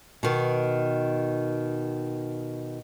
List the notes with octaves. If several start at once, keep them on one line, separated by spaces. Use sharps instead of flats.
B2 D#3